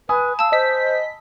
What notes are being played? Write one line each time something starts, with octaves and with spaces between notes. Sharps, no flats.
B4 G#5 B5 D#6
F5 A5 E6
C5 D#5 B6